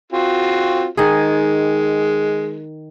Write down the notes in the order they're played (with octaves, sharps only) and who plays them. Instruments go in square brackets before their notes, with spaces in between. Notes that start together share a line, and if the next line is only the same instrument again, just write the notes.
[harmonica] C4 F4 F#4
[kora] D#3 G#4 [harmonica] G#3